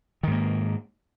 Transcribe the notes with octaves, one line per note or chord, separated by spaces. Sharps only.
G#2 D#3 A#3